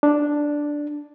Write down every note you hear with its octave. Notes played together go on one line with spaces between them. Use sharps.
D4